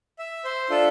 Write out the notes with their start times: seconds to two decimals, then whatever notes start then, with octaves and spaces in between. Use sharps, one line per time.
0.19 E5
0.45 C5
0.70 D4 F4 A4 E5